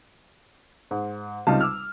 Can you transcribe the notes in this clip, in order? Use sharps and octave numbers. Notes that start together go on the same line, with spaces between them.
G#2
C#2 C3 G3 D#4 F4 A5
D6 E6 F6